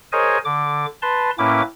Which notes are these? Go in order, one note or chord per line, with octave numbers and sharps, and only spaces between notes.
G#4 A#4 C5 C#5 D#5 G#5
D3 D6
B4 A5 C6
A2 A#3 C#4 E4 B4 D6